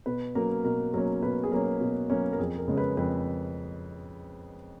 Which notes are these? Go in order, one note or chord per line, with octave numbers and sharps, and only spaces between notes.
B2 B4
F#3 A#3 C#4 A#4
B2 A#4
F#3 A#3 C#4 A#4
B2 B4
G#4
F#3 A#3 C#4 A#4
B2
F#3 A#3 C#4
A#4
F2 G#4
A#4
C#3 G#3 C#4
B4
F2 B4